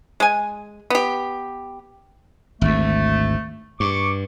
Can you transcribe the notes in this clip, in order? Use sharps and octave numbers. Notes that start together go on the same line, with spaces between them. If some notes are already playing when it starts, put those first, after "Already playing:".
G#3 G#5
B3 G4
G#1 D2 A3
G2 C#6 D6